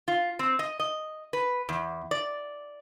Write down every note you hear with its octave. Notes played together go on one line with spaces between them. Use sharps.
F4
C4
D#5
D#5
B4
E2
D5